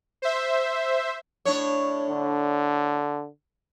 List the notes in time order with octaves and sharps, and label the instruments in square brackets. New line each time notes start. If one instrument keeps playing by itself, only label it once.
[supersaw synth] C5 E5
[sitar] A2 D4 C#5
[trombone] D3